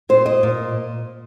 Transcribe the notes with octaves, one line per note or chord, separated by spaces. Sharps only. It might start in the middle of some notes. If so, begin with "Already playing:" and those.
A#2 C5
D#5
A#2